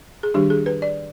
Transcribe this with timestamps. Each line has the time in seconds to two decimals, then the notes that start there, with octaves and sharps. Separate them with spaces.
0.23 G#4
0.34 D#3 G3 D4 G4
0.50 G#4
0.66 B4
0.82 D5